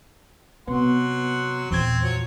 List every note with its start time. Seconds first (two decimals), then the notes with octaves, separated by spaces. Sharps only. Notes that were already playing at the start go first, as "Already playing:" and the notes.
0.68 C3 F#3 B3 F#5 C6
1.71 E2 A#2 E3 C4 G#6
2.03 F3 F#3 C#5